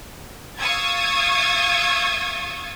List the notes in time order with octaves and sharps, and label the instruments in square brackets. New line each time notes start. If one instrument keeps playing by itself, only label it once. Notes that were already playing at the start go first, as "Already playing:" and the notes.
[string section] F5 C#6 D#6 E6 G#6 A6